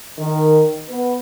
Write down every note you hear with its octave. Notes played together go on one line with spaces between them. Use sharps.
D#3
B3